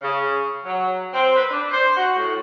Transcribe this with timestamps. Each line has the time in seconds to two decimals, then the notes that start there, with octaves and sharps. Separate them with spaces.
0.02 C#3
0.65 F#3
1.14 C4
1.36 B4
1.51 D4
1.72 C5
1.97 F#4
2.17 A2